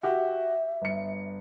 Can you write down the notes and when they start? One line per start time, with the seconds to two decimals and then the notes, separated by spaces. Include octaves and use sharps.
0.03 F#4 G4 E5
0.82 G1 C#7